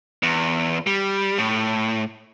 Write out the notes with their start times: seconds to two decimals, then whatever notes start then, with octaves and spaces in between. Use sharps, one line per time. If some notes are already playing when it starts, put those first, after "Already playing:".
0.23 E2
0.87 G3
1.38 A2